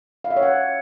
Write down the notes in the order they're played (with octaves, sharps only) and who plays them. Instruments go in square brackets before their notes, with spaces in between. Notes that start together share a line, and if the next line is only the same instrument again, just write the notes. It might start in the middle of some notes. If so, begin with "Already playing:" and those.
[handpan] F5
E5
C#5
F#5